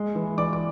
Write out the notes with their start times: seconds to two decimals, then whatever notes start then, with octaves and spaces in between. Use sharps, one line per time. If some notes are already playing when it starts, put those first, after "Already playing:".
Already playing: G#3
0.15 E3
0.38 E3 D5 D6
0.53 D6